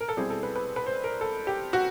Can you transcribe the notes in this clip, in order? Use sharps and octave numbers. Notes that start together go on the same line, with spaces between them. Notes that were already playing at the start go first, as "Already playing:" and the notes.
A#4
A4
B2 G3 C4 E4 G#4
A4
B4
B4
B4
C5
A#4
A4
G4
F#4